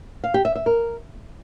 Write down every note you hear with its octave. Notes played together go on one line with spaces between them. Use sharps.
F5
G4
E5
E5
A#4